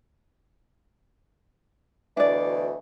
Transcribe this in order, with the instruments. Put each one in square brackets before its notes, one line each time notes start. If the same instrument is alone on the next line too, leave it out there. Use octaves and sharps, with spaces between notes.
[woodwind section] D2 B2 E3 [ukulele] D4 D5